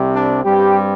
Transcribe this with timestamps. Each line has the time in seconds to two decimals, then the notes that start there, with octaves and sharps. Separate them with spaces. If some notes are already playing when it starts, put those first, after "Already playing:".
Already playing: C2 C3 G3
0.14 D4
0.44 G2 G3 C4 G4